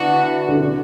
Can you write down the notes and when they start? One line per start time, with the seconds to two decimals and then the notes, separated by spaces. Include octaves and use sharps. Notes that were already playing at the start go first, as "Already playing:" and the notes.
Already playing: D3 E3 B3 D4 F#4
0.48 D3
0.58 C#3